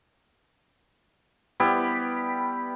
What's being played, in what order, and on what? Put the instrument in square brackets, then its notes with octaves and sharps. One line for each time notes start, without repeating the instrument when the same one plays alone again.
[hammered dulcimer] G3 B3 E4 G4